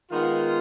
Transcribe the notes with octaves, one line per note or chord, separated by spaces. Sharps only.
D#3 G#3 B3 F4